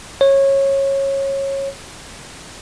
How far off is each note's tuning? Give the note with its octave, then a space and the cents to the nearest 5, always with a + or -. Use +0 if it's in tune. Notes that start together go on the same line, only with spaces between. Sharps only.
C#5 -20